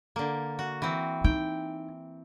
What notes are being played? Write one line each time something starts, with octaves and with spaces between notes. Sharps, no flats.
D3 A#3
F#4
E3 C4
D#4 G5